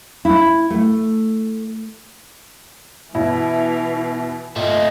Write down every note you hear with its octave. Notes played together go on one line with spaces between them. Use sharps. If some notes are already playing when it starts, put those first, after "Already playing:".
E4
A3
B2 E3 E4
A#2 A3 D#4